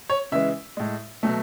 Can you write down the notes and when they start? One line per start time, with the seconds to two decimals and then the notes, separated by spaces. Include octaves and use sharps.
0.10 C#5
0.32 C#3 E3 G#3 E5
0.77 A2 G#3
1.23 B2 F#3 A3